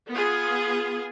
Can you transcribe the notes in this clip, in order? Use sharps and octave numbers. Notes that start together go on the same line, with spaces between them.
B3 F4 G#4